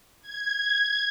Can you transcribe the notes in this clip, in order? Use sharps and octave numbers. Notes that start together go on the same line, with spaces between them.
G#6